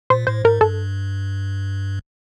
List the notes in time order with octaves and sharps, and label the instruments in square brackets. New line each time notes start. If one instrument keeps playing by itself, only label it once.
[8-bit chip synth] A#2 [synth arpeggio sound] C5
[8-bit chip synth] A2 [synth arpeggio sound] C5
[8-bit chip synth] G#2 [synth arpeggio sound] A#4
[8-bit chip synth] G2 [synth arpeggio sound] A4